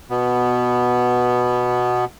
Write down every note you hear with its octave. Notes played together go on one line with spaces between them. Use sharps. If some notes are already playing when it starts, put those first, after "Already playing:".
B2 B3